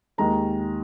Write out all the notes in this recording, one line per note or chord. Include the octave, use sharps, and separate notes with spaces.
D#2 D#3 G#3 D#4 A#5